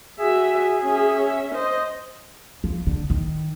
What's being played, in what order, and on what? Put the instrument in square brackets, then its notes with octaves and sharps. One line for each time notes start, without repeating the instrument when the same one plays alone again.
[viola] F#4 E5 [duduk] G#4
[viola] C#4 E5
C5 D#5
[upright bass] F3
D3
D#3